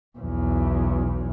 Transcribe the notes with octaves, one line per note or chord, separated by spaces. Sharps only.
B1 E2